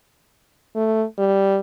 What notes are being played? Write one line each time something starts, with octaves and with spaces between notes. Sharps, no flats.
A3
G3